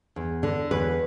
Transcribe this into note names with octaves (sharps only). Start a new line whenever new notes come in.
E2
D3
E2 B4